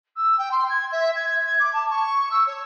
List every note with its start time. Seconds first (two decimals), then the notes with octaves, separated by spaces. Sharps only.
0.16 E6
0.38 G5
0.51 C6
0.69 G#6
0.92 E5
1.15 G#6
1.46 G#6
1.59 D6
1.73 A5
1.90 C#6
2.31 E6
2.47 C#5